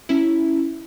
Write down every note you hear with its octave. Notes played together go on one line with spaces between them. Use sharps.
C#4 E4